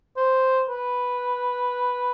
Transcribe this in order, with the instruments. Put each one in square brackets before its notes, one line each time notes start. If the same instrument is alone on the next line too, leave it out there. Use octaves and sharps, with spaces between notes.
[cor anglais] C5
B4